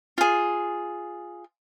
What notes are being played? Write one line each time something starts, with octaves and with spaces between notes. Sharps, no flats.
F4 G#4